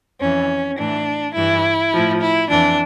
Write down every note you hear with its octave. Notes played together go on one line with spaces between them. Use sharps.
F2 E3 C#4
A2 E3 D4
G2 E3 E4
A2 F3
E4
F2 E3 D4